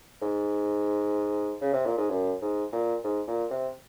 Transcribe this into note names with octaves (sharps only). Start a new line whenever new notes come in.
G#2
C#3
C3
A#2
G#2
F#2
G#2
A#2
G#2
A#2
C3